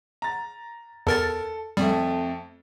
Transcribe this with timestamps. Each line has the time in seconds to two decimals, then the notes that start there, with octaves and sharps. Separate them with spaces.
0.22 A#5 A6
1.07 E2 A4 A#4 A6
1.77 F2 G3 A3